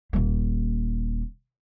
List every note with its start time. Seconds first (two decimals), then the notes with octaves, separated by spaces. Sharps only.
0.13 D#1 A#3